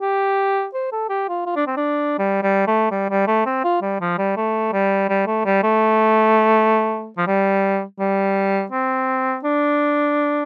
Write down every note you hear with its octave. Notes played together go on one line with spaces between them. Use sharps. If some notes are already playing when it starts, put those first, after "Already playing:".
G4
C5
A4
G4
F4
F4
D4
C4
D4
G3
G3
A3
G3
G3
A3
C4
F4
G3
F3
G3
A3
G3
G3
A3
G3
A3
F3
G3
G3
C4
D4